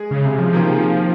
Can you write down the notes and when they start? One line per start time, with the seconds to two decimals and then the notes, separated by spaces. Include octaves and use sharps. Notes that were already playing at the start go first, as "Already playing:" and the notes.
Already playing: G#3 G#4
0.11 C#3
0.25 C3
0.39 F3
0.53 C3 D#3 A#3 F4 G#4